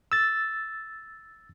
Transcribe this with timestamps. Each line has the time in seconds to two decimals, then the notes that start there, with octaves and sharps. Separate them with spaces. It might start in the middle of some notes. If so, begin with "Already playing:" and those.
0.12 E6 A6